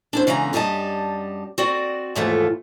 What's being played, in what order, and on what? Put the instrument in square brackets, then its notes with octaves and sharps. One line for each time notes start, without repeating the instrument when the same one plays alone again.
[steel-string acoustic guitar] D4 E4 C5
C#3 E3 G#3 B3 A#5
F#2 G3 G4 D#5 A5
C4 F#4 D5
D#2 G#2 E3 A3 F4 A4